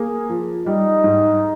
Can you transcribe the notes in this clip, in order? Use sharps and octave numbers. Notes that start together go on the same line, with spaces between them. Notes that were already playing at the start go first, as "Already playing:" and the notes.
Already playing: A#3 G#4
F3
G3 D#4
G#2